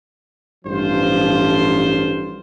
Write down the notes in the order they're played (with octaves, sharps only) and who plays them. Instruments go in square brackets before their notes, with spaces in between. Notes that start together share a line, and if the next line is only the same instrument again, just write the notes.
[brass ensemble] A1 G2 F3 F4 C5